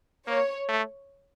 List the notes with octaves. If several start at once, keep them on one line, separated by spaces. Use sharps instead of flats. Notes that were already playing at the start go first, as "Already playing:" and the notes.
A#3 C#5
A3